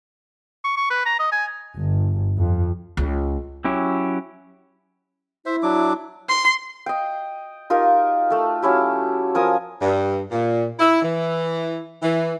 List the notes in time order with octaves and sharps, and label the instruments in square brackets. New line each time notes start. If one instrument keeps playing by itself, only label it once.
[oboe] C#6
C#6
B4
A#5
D#5
G#5
[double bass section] G1
F2
[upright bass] C#2
[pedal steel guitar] F#3 C#4 E4 G4
[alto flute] E4 [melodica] C5 E5
[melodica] F#3 D4 D6
[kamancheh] C6
[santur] D#5 G5
D#4 F4 G4 A#4
A3 A4
F#3 C#4 E4 G4
F3 A#4 G#5 D#6
[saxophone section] G2
A#2
E4
E3
E3